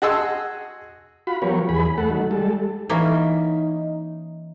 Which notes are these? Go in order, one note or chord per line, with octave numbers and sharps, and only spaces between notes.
F#4 G#4 D#5 A5 C6 E6
F4 F#4 B5
F3 F#3 B3 G4 A#4 C#5
E2 G#4 B5
A3 A4 F#5
D#3 F#3
G3 G#3 A4
E3 A#3 C#4 D#4